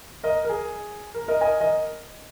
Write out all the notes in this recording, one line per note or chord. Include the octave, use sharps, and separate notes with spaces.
A#4 D#5
A#4
G#4
A#4
A#4 D#5
D#5 G#5
A#4 D#5